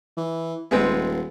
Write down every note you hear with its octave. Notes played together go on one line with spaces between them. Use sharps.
E3
D#1 G#3 B3 C4